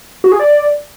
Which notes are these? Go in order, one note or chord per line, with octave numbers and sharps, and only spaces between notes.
F#4
G#4
D5